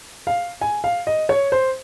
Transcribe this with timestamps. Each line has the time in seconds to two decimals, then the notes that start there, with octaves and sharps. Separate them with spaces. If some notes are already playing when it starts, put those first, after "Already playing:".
0.27 F5
0.61 G#5
0.84 F5
1.07 D#5
1.29 C#5
1.52 C5